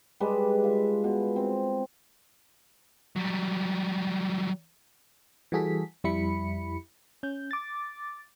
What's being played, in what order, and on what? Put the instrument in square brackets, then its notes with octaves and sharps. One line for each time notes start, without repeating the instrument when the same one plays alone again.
[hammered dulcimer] G3 G#3 D4 B4
F4 E5
B2
C4
[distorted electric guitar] F#3 G3
[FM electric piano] E3 G3 F#4 G#4 A4 B6
F2 G3 E4 B5 C#7
C#4 G6
D6 A6